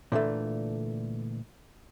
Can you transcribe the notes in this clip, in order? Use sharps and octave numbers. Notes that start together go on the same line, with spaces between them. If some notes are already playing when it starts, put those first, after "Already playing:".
A#2 D3 E3 A3